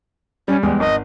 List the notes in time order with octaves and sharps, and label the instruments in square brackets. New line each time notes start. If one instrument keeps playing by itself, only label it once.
[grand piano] G3 [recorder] C#4
[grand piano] E2 G#3 [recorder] G3
[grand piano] G#1 [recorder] D#5